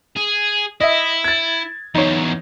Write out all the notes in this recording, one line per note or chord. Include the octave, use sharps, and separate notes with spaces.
G#4
E4 D#5 E5
G#6 A6
E2 F#3 D#4 C#5